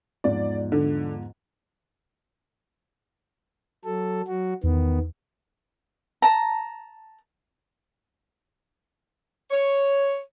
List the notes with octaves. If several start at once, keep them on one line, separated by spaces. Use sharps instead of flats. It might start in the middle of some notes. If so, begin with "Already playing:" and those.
E2 G#2 F3 D5
D3
F#3 A4
F#3 F#4
E2 D#3 B3
A5 A#5
C#5